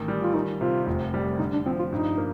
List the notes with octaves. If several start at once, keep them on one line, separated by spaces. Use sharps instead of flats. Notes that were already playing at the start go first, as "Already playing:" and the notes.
Already playing: A1 D#3
G3
F4
D#3 D#4
C3 F4
F1
G3
D3 D#4
D4
F3 C4
F4
G2 D#4
A#3